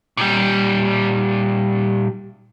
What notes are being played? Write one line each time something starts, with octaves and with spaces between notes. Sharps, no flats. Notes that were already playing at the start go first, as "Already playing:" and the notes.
A#2 G3